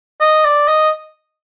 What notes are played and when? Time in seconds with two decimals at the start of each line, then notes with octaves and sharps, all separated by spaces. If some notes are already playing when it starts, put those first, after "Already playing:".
0.21 D#5
0.45 D5
0.68 D#5